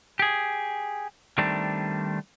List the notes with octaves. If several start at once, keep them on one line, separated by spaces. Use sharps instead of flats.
G4 G#4
D#3 G3 A3 C4 D4